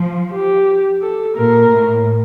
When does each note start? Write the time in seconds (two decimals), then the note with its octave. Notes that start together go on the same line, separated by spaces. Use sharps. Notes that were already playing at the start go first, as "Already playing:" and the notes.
Already playing: F3
0.33 G4
1.02 A4
1.37 A#2 A#4
1.71 A2